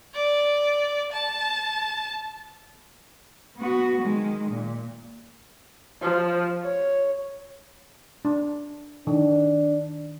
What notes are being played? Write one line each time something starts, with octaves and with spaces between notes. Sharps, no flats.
D5
A5
B3 F#4
D#3 G#3
A#2
F3
C#5
D4
D#3 D4